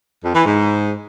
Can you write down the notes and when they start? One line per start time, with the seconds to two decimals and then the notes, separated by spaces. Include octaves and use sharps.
0.24 F2
0.34 E3
0.45 G#2